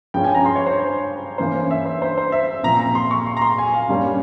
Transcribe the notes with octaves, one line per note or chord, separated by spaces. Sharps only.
G2 F3 G#3 C#4 G5
G#5
A#5
C6
C#5
C5
G2 E3 A#3 C#4 C5
E5
C5
C5
C5
E5
A#2 F3 C4 A#5
A#5
C6
C#6
C6
A#5
C6
G#5
F5
G2 G3 A#3 C#4